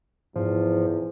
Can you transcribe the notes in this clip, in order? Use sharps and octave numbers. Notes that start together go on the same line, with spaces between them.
E2 G#2 F3